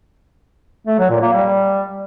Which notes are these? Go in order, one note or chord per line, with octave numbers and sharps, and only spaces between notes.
A3
F#3
A#2
A#3
G3